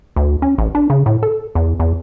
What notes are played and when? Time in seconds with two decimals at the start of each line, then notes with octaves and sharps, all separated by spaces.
0.16 D2
0.42 C#4
0.58 A1
0.75 D4
0.90 C#3
1.06 A2
1.23 A4
1.55 E2
1.80 E2